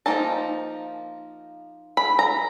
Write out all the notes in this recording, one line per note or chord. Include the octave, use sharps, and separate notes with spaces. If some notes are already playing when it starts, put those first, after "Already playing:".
F3 A#3 D#4 A5
B5
A#5